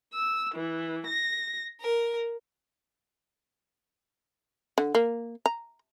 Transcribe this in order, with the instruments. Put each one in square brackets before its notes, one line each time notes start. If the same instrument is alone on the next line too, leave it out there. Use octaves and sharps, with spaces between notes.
[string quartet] E6
E3
A#6
A#4
[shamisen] D3
A#3
A#5